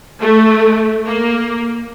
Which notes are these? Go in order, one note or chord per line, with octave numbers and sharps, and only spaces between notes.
A3
A#3